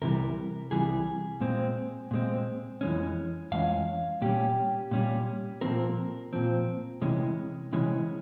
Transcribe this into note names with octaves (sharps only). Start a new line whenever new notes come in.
C2 C3 E3 G3 A#4
C2 C3 E3 G3 G#4
A#2 G#3 C4
A#2 G#3 C4
F2 E3 G#3 C#4
F2 E3 G#3 C#4 F5
A#2 G3 C#4 G4
A#2 G3 C#4
A#2 F3 C4 A#4
A#2 F3 C4
C3 E3 G#3 C#4
C3 E3 G#3 C#4